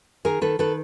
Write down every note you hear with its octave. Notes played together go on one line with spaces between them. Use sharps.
D#3 G#4 A#4
D#3 A4 B4
D#3 A4 B4